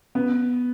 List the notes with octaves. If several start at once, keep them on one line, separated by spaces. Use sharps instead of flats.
B3